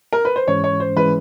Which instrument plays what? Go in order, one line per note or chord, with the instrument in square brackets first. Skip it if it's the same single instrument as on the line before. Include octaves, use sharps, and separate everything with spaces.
[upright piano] A#4
B4
C5
[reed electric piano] G#2 E3 G#3 C#4 [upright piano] C#5
[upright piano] C#5
C5
[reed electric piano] E3 G#3 C#4 [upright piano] B4